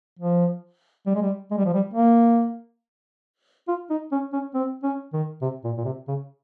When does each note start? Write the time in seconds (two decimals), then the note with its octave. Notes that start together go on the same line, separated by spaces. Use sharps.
0.19 F3
1.06 G3
1.15 G#3
1.22 G3
1.51 G#3
1.58 G3
1.66 F3
1.74 G3
1.94 A#3
3.68 F4
3.90 D#4
4.12 C#4
4.33 C#4
4.54 C4
4.83 C#4
5.13 D#3
5.42 C3
5.64 A#2
5.77 A#2
5.85 C3
6.08 C#3